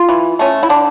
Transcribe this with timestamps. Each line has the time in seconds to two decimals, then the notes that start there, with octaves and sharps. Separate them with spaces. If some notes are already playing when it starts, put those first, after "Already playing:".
Already playing: F4
0.09 E3
0.39 A3 C#4
0.63 E4
0.69 D3 D4